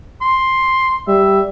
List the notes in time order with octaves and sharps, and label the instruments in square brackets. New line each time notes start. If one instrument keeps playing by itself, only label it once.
[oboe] C6
[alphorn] G3 [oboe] E5